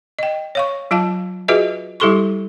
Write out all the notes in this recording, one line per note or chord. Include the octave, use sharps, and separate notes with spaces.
D#5 G5
C#5 F5 C#6
F#3 F4 F5 A5
F4 F#4 G#4 B4 D#5 E5
G3 E4 G4 A4 C6 C#6